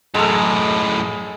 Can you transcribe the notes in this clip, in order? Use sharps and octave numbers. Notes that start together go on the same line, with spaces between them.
F#2 A2 G#3 A4